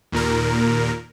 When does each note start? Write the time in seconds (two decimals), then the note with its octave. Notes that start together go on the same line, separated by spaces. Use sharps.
0.12 D#2 A#2 A#4